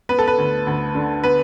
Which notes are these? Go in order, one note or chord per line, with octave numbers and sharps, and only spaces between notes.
B3 B4
A4
B4
D2
D2
D3
B3 B4